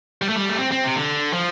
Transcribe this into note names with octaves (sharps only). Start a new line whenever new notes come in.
G3
A3
G3
A3
C4
C4
C3
D3
F3